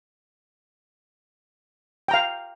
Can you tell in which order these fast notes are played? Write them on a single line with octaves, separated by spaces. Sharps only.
G5 A#5 F5